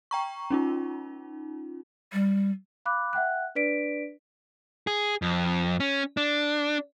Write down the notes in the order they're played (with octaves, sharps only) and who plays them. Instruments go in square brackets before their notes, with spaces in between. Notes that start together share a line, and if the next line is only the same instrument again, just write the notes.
[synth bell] G5 A#5 C#6
C#4 D#4 F4
[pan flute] G3
[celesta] F5 B5 D6 F#6
E5 F#5 G5 F#6
D4 B4 D5 B6 D7
[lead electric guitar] G#4
F2
C#4
D4